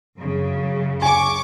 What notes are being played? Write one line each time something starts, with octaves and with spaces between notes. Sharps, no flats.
F#2 C#3
G#5 C#6 D6